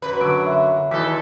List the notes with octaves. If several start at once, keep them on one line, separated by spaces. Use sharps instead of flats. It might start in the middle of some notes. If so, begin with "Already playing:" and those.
F#2 B4
D3 F#3 D7
E5
D#2 E3 D#4 A4 B6